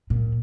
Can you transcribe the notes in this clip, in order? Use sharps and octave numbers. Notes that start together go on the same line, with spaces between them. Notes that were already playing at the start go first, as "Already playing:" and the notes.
A#2